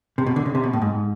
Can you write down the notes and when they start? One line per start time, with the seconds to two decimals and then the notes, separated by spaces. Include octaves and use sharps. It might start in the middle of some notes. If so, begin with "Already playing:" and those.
0.18 C3
0.27 B2
0.36 D3
0.46 C#3
0.55 C3
0.64 B2
0.73 A2
0.82 G#2